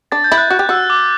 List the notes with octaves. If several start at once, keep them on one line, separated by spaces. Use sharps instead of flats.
D4 A6
G6
E4
F#6
F#4 F#6
G4
F#4 E6
D6